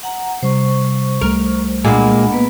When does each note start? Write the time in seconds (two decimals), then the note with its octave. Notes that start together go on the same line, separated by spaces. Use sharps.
0.03 F#5 A#5
0.43 C3 G3 C5 C#6
1.21 C2 G3 A3 A#4
1.84 A#2 G#3 A#3 D4 F#5 B5
2.32 A#3 B3 B4